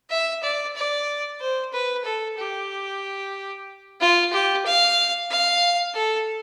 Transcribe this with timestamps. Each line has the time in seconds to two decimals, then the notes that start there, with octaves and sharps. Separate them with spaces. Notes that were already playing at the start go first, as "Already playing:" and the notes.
0.10 E5
0.43 D5
0.76 D5
1.41 C5
1.73 B4
2.05 A4
2.38 G4
4.01 F4
4.33 G4
4.66 F5
5.31 F5
5.95 A4